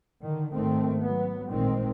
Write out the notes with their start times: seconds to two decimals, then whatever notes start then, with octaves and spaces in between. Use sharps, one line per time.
0.23 D3 D#3
0.54 G#1 D#3 A3 C4
1.02 F#3 B3
1.48 A1 A#2 D#3 G#3 C4